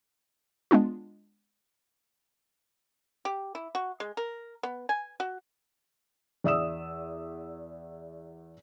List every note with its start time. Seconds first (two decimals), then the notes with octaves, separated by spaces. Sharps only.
0.71 G#3 B3 D4 F4
3.25 G4
3.55 E4
3.75 F#4
4.00 G#3
4.17 A#4
4.63 B3
4.89 G#5
5.20 F#4
6.44 E2 D5 E5 D#6 E6 E7